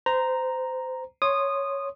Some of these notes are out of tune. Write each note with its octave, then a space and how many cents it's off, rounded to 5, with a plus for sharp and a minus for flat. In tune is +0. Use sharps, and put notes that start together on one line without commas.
C5 -25 A#5 +0
C#5 +0 C6 +10 D#6 -15